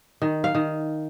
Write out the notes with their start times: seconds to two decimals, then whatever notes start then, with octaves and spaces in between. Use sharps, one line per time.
0.22 D#3
0.44 F5
0.55 D#3